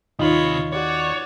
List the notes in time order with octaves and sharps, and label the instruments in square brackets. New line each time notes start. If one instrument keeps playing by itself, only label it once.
[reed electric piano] D#2 D#3 D#5 [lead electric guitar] C3 B5 [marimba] D#4 [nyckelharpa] F4 C#5
[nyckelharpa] F#4 D5 [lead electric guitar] C#5